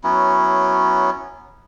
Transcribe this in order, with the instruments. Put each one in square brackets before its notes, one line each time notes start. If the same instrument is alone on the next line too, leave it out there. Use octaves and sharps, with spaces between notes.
[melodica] F#3 B3 C#4 E4